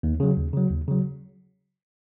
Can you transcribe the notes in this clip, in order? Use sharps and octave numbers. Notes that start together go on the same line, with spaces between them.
D#2
C#3 F#3
D#2
C#3 F#3
D#2
C#3 F#3